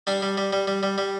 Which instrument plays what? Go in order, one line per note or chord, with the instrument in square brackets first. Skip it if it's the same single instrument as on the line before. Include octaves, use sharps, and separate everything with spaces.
[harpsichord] G3 D4
G3
G3
G3
G3
G3
G3